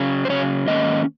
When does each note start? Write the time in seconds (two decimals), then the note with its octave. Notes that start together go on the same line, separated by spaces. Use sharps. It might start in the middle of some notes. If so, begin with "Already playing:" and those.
Already playing: C#3 F#3 C#4
0.25 C5
0.29 C#3 F#3 C#4 C#5
0.68 G#2 D#3 A#3 C#4 D#5